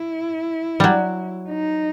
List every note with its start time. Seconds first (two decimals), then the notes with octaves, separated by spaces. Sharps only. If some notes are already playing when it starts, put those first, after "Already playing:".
Already playing: E4
0.80 F#3 G3
1.49 D#4